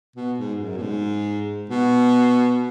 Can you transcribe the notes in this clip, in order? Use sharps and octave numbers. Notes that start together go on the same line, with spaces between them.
B2
G#2
F#2
B2
G#2
B2